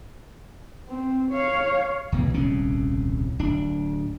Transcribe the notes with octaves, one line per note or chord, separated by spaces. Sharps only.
C4
C#5 F5
C#2 B2 E3
D#1 C2 C#3 C#4
D1 D4